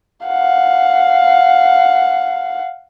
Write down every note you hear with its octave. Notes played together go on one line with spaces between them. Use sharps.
F5 F#5